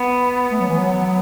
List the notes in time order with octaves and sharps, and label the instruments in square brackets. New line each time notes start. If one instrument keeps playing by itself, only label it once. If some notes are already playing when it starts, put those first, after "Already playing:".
Already playing: [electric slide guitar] B3
[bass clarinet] A3
F#3
E3
F#3